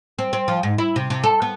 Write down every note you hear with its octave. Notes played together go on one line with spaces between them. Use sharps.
C4
C4
F3
G#2
E4
C3
C3
A4
B3